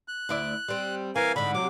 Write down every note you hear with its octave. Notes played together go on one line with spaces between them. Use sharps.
F#6
D2 E4 D5
G3 C4
E3 A#4 F5 G#5
G#2 D3 B5
C3 F#3 D6